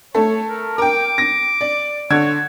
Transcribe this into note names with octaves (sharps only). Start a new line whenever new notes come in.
A3 A4 C#5
A#4
A#4 G5 D6
A#6
D5
D3 C#5 G#6